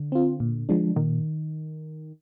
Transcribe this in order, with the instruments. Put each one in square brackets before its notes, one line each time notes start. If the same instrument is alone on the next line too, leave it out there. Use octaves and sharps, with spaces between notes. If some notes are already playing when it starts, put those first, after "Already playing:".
Already playing: [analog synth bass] D3
[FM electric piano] C4 F4
A#2
F3 G#3 D4
[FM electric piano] A#2 [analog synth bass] D#3